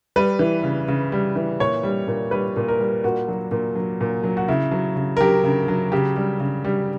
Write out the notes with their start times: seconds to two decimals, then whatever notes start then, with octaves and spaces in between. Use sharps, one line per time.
0.16 G3 B4
0.39 E3
0.63 C#3
0.88 C#3
1.12 G3
1.36 E3
1.60 A#2 C#5
1.83 G3
2.08 A#2
2.31 G3 B4
2.56 A#2
2.68 A#4
2.79 G3
3.04 A#2 F#4
3.28 F#3
3.51 A#2
3.75 F#3
4.01 A#2
4.24 F#3
4.37 F#4
4.48 C#3 E4
4.72 F#3
4.96 C#3
5.17 A#4
5.21 F#3 G4
5.44 C#3
5.68 F#3
5.92 C#3 G4
6.16 G3
6.40 C#3
6.64 G3